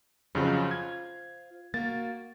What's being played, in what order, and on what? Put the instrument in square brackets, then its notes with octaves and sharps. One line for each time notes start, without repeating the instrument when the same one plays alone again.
[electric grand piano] F2 C#3 F#3 [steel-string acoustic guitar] F4 C5
[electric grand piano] G#6
[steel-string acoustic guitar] A#3 F#4 [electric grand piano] A6